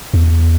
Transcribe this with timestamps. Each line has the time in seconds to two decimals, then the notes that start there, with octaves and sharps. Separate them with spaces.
0.14 E2